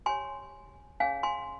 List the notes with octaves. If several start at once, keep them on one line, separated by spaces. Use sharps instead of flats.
G4 C#5 G#5 C6
C#4 G#4 C#5 F5 G#5
G#5 C6